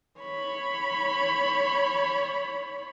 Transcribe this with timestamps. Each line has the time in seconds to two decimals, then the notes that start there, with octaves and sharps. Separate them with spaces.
0.20 C#5 B5